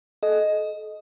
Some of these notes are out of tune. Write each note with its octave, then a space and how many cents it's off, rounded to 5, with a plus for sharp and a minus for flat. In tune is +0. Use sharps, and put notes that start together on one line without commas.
A4 -35 D#5 +0